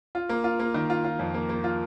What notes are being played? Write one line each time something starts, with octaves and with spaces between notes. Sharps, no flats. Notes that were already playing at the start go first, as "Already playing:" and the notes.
F4
A#3
F4
A#3
D#3
F4
F4
F2
A#3
A#3
F4